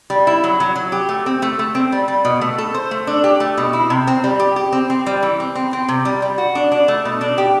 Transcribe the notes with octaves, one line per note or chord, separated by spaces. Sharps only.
G3
E4
F#3
F#3
F#3
G4
A3
C4
A3
A3
C4
G3
G3
B2
A3
A4
C5
A3
D4
G4
A3
B2
E4
C3
C4
G3
G4
G4
C4
C4
G3
E3
C4
C4
C4
C3
G3
G3
F#4
D4
D4
A3
B2
D4
G4